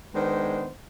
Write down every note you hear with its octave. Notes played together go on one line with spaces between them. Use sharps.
D#3 G#3 B3 D4 B4 C5